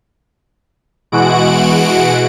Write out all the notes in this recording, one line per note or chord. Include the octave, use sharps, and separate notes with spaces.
B2 E3 G#3 F#4 F#5 D7